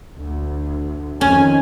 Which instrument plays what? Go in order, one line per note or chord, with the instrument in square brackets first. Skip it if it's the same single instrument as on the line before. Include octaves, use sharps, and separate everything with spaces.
[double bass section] D2
[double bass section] F2 D#3 [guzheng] C#4 [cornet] G#5